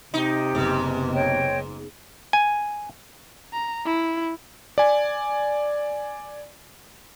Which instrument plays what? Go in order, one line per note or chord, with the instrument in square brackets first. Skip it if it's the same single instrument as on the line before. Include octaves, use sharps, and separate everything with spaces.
[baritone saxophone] C3 [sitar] D#4 [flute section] G4
[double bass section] F#1 B3 [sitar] G#2
[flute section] C#5 D#5 G5
[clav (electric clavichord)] G#5
[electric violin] A#5
E4
[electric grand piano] D5 G#5